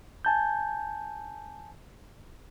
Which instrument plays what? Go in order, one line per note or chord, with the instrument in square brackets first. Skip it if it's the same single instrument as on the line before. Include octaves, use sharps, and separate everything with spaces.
[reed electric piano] G#5 A5 G6